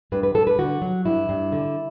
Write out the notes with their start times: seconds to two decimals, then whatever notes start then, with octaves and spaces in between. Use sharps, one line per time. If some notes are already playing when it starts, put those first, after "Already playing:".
0.12 G2 B4
0.23 B4
0.34 G2 A4
0.47 B4
0.59 D3 F#4
0.82 F#3
1.05 G2 E4
1.29 G2
1.52 D3